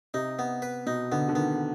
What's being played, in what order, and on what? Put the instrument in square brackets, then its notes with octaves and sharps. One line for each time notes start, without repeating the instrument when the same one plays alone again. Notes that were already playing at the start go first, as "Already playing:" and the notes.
[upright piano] C3 [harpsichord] D#4
[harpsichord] B3
B4
[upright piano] B2 [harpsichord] D#4
[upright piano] D3 [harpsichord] B3
[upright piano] D3
[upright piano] D#3 [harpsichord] B3